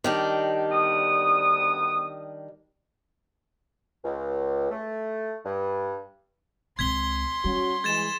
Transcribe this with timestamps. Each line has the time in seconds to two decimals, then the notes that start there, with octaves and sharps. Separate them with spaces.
0.04 D#3 G3 D4
0.70 D2 B3 D#6
4.04 C#2
4.70 A3
5.45 G2
6.79 C#2 C4 C6 G#6 B6 G7
7.45 G3 C#4 F#4
7.84 E3 G#3 G#6 A6 E7